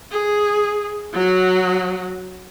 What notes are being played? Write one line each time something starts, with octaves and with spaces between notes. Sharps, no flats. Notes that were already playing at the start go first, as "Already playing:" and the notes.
G#4
F#3 F#4